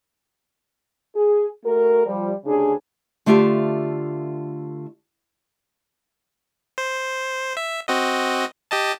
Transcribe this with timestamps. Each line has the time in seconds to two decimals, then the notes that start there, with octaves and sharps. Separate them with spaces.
1.15 G#4
1.65 A3 F#4 A#4
2.06 F3 G3
2.45 D2 C#3 D4 G4 G#4
3.26 D3 A3 F4 G4 E5 F5
6.78 C5
7.57 E5
7.88 C4 F#4 D#5
8.71 G4 D#5 A5